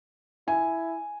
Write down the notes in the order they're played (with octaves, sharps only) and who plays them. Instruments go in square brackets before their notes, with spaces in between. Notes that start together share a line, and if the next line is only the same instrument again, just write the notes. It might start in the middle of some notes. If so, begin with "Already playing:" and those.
[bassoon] E4 [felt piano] G#5